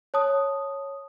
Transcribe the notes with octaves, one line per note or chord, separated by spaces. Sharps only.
C#5 A5 D#6